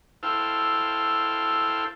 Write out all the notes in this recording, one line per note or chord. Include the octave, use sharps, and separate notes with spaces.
E4 A4 C5 F5 G5